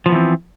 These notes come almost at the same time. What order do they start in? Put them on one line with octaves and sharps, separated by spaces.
F3 B3 E3 C4